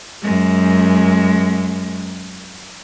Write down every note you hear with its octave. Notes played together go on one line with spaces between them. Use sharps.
F#2 G#3